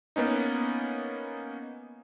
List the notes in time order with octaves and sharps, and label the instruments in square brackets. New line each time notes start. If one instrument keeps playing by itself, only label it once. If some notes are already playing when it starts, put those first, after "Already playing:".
[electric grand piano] A#3 B3 C#4 D#4